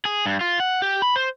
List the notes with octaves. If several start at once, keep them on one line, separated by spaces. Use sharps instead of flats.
G#4
G2
F4
F#5
G4
B5
C5